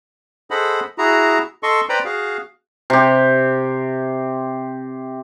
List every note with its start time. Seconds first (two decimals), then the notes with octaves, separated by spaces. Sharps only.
0.51 G#4 A4 C5 D#5 F#5 B5
0.98 E4 F#4 G#4 A#5
1.63 A4 D#5 C6 C#6
1.89 B4 C5 D5 G5 A#5 B5
2.05 F#4 G#4 F5
2.90 C3 G4